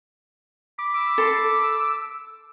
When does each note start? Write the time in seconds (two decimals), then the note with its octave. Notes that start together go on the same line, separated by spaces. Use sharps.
0.79 B5 D6
0.94 D6 E6
1.18 A4 C6